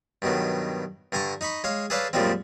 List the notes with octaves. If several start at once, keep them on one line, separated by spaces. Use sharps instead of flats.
G2 B2 D#3 F#3
G2 D3 G#5 A#5 C#6
D#4 D#5 B5 C#6
G#3 C#5 F5
G#4 A4 B4 C#5 D5 F5
F#2 A#2 F3 G3 G#3 C4